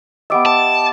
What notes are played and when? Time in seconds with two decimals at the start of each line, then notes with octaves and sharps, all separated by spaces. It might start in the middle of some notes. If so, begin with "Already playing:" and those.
0.30 B3 G4 D#5 E5 D6 D7
0.46 D5 A5